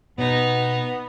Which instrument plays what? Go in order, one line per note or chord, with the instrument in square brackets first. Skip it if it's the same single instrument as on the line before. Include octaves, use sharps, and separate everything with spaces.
[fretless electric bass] B2 [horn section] B3 [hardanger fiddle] D#4